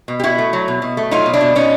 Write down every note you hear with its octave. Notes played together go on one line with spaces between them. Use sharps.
B2
G4
B2 E4 F#4
A3
F#3
B2
B2
A3
F#3 D#4 F4
B2
D4 E4
B2
B2 C#4 D#4